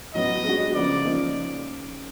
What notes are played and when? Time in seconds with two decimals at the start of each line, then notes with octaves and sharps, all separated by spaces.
0.15 A2 F#3 B3 D#5
0.45 G#3 B3 D4 F#4
0.74 C#3 F3 A#3 D5
1.04 C#3 F3 A#3 D#4